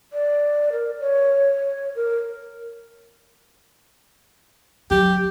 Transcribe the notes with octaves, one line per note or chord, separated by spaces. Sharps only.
D5
A#4
C#5
A#4
F#3 G4